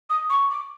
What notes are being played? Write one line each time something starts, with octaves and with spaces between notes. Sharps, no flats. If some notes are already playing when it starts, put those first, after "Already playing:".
D#6
C#6
D6